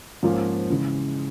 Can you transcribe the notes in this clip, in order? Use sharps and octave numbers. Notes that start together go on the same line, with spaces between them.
G#2 F3 A#3 C#4
C#3 E3 G#3